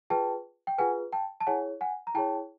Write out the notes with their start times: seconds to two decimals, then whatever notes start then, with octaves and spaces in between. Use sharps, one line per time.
0.10 F4 G#4 B4 G5 A5
0.67 G5
0.78 F4 G#4 B4 F#5 G#5
1.12 G5 A5
1.40 A5
1.47 E4 G#4 C#5 F#5 G#5
1.81 F#5 G#5
2.07 A#5
2.14 E4 G#4 C#5 G5 A5